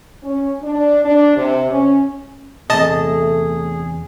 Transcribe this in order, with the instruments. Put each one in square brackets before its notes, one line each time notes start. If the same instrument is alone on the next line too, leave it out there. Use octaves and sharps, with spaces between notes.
[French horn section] C#4
D4
D4
C3
C#4
[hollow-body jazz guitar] E2 C3 [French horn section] A3 [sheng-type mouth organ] G#4 [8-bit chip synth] D#5 A5